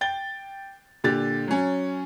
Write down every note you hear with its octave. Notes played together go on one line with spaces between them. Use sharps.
G5 A6 G7
A#2 D3 G4 A6
F#3 C#4